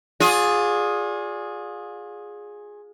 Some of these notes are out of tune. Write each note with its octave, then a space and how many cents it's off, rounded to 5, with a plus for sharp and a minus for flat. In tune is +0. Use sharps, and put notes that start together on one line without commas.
F4 +35 G#4 +0 D5 -10